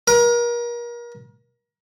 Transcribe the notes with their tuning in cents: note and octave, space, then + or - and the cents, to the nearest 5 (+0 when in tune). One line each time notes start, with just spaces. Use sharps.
A#4 +35